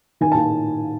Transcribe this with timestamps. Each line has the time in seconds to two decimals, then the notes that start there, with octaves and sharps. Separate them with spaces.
0.21 D#3 G#5
0.32 D#3 A5